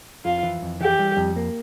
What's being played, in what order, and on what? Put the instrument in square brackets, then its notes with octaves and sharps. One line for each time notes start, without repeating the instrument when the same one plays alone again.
[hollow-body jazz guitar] F2 [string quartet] F4
[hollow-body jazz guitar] E3
F2
[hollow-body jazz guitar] E3 [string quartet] G4
[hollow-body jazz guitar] G3
F2
A#3